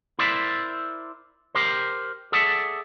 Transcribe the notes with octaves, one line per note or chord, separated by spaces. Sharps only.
E4 A#4 C5 D5 E5
G4 A#4 C5
G#4 A4 D5 E5 F#5 A5